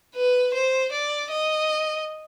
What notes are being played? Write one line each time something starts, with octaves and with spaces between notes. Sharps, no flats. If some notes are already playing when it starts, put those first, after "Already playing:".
B4
C5
D5
D#5